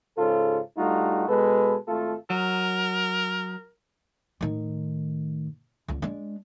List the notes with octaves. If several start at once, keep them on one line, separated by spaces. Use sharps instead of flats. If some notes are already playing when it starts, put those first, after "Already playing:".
G#2 C#3 F4 A4
G2 G3 A3 D#4 F4 F#4
B2 G#3 A4 B4
G#1 A3 F4 A4
F#3 A#4
A2 D#3
C#2 D3
G#3 D4